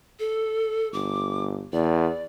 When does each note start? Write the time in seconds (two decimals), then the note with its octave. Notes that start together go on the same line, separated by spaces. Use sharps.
0.20 A4
0.93 G1 D6
1.73 E2 D5